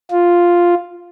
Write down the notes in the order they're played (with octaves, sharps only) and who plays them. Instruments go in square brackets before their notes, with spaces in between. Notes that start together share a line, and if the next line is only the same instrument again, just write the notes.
[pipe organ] F4